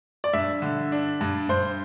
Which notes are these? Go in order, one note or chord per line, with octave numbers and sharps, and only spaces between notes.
D5
G2 E5
D3
D4
G2
G2 C5